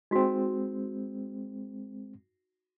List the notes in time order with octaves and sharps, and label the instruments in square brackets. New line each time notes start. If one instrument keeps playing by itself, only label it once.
[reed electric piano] G#3 C4 [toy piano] D#4 F#4